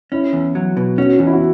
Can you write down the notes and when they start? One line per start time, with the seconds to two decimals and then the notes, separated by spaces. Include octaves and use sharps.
0.12 C#4 E4
0.33 E2
0.55 F#3
0.77 B2
0.98 C#4 F#4
1.19 E2 F#4
1.27 E4
1.33 F#4